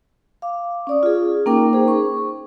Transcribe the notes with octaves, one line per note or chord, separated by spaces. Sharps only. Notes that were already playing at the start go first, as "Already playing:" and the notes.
F5 D6
C#4 D5 D#6
F4 G#4
A#3 C#4 D#4 A#4 G5 D6
D#4 G#4 C5
C#6